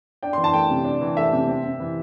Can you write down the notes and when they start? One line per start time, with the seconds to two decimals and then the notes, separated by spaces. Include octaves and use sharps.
0.23 D4 G5
0.33 C6
0.38 E3
0.44 A5
0.53 A3 G5
0.70 C3
0.85 D4
1.01 E3
1.17 A3 E5
1.33 C3
1.48 C4
1.64 C4
1.80 E3